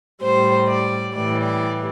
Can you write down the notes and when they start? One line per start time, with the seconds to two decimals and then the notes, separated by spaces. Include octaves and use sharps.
0.24 A2 G3 C5
0.69 D5
1.14 A2 E3 G3 D5
1.43 D5